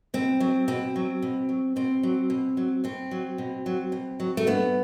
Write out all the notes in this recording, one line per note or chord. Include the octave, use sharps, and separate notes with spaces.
B2 C4
F#3
B2 C4
F#3
B2
F#3
B2 C4
F#3
B2
F#3
B2 C4
F#3
B2
F#3
B2
F#3
A3
G2 B3